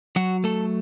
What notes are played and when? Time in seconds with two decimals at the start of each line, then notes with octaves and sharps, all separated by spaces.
0.16 F#3 F#4
0.44 A3 A4